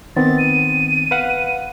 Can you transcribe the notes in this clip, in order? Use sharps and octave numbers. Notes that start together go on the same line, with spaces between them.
D#3 B3 C4 A6
D#7
B4 F5 F#5